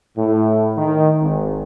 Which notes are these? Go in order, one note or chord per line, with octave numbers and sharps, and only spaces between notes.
A2
D#3
G#1